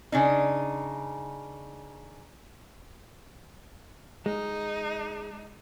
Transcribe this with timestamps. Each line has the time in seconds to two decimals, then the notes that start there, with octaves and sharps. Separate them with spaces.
0.12 C#3 D4 D#4
4.26 G#3 D#4